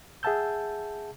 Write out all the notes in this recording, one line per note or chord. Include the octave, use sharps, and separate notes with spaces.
G#4 E5 F#5 A5 E6 G6